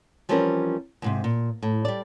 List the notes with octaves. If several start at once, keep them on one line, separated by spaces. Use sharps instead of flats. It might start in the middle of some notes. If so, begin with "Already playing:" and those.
E3 F3 G3 C4 C#4 A#4
D#2 G#2 C3
A#2
A2
G3 D5